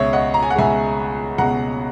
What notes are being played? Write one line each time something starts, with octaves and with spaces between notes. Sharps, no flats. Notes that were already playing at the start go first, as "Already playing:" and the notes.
Already playing: C#2 B2 G#3 C#5 E5
D#5 F#5
A#5
G#5
F#5
C#2 B2 G#3 E5 G#5
C#2 B2 G#3 F#5 A#5